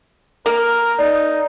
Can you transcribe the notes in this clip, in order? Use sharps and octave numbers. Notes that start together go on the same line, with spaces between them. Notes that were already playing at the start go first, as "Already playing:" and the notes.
A#3 A#4
D#4 D5